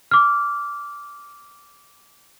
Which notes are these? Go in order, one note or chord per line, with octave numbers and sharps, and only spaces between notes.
D6 F6